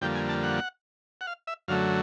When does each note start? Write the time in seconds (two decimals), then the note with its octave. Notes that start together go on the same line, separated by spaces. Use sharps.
0.01 F2 D3 G3 A#3 G5
0.15 G#5
0.29 A5
0.43 F#5
1.21 F#5
1.27 F5
1.47 E5
1.68 F#2 D3 F#3 A3 F5